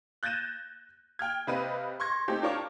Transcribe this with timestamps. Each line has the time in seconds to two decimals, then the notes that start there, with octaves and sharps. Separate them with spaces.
0.23 F#6 G6 A6 A#6 D#7 E7
1.19 G5 F6 G#6
1.47 C3 C4 B4 D#5 F5 D#7
2.00 C6 C#6 G#6 A#6
2.28 A3 C4 D#4 G4
2.42 D4 F4 A#4 C#5 A5 D6